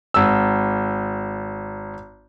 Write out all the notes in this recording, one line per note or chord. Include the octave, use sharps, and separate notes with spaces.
G#1 E6